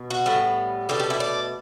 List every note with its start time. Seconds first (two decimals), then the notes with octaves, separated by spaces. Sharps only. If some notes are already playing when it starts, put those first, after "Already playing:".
Already playing: B2
0.10 F#4
0.26 A2 G3 B3
0.89 B2 A3 D4 G4
1.00 G4
1.10 E4
1.20 D4